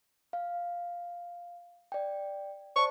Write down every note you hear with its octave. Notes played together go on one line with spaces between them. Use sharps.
F5
D5 G5
C5 D5 A5 C#6